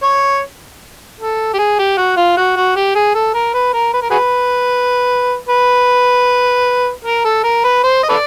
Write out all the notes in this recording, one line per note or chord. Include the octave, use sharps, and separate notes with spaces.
C#5
A4
G4
G#4
G4
F#4
F4
F#4
F#4
G4
G#4
A4
A#4
B4
A#4
B4
A#4
F#4 G#4 B4
B4
A#4
A4
A#4
B4
C5
D#5
A4 B4 D5